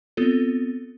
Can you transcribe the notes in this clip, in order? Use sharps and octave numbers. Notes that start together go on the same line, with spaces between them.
B3 C4 F4 A4